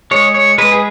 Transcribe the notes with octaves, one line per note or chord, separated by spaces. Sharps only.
G#3 C#5
C#5
G#3 B4
G#4